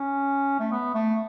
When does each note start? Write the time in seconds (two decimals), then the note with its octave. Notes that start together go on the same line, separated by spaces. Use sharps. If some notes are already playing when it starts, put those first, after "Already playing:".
Already playing: C#4
0.60 A3
0.72 B3
0.94 A3